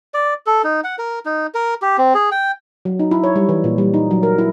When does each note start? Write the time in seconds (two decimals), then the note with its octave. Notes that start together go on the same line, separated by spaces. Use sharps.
0.14 D5
0.46 A4
0.64 D#4
0.84 F#5
0.99 A#4
1.25 D#4
1.54 A#4
1.82 G4
1.98 C4
2.15 G#4
2.32 G5
2.85 F#3
2.99 D#4
3.11 E4
3.24 C#5
3.36 G3
3.49 E3
3.64 A#2
3.78 G3
3.94 D#4
4.11 F#3
4.23 A#4
4.38 E4